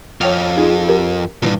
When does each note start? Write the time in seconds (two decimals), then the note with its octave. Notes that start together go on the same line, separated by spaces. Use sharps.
0.21 F2 C#5 G5 F6
0.57 D#4 F4 G#4
0.89 G4 A#4
1.42 C2 G2 A#2 D#3 E3